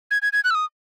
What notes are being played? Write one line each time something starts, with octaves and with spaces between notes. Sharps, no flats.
G#6
G#6
G#6
F#6
E6
D#6